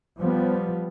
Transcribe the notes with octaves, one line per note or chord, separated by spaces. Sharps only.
F3 G3 B3